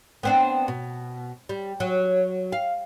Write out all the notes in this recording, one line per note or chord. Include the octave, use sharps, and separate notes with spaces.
B3 C4 D4
B2
G3
F#3
F5